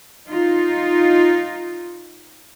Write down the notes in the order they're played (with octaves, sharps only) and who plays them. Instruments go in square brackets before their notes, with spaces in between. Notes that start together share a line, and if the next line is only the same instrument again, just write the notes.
[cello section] D#4 F4